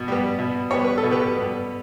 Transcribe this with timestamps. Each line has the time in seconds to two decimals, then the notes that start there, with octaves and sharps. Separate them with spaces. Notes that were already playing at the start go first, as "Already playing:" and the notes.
Already playing: B2
0.08 G3 B3
0.39 B2
0.71 G3 B3 C#5
0.84 B4
0.98 A4
1.03 B2
1.11 G4 B4
1.35 G3 B3